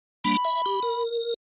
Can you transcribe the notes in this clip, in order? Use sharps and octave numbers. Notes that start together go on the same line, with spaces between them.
G3 A#3 D4 B5
E5
G4
A#4